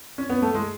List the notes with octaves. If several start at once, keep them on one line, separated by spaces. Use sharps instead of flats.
C#4
B3
A3
G#3